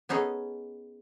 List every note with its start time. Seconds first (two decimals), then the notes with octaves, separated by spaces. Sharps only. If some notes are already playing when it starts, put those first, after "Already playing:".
0.09 B3 C#4 D#4 G#4 A4